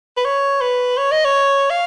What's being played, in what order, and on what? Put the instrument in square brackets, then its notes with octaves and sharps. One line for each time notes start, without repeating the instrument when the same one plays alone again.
[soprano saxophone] B4
C#5
B4
C#5
D#5
C#5
F5